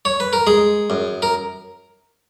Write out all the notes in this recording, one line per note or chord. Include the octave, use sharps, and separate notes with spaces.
C#5
B4
A#4
G#3 G#4
F#2
A#4